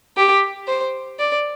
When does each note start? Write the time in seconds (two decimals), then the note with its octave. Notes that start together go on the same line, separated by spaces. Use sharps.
0.17 G4
0.68 C5
1.19 D5